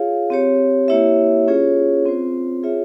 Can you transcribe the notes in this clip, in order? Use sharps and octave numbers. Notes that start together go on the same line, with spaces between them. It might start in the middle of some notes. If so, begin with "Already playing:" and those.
Already playing: F4 G#4 C#5 F5
C4 G4 C#5
A#3 E4 G4 C#5 E5
C#4 F4 G#4 C#5
C4 F4 C5
F4 G#4 C#5 E5